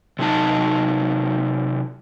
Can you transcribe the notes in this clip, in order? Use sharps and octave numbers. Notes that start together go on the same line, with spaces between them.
C3 F#3 D#4 A5